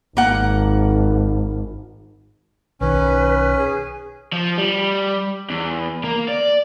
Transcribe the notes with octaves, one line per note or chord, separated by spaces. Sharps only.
G#1 A#3 F#5
B1 D#3 C#4 B4
G#4
F3
G3
E2
A#3
D5